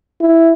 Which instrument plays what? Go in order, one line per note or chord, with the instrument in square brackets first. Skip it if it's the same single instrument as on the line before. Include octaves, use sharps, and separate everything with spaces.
[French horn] E4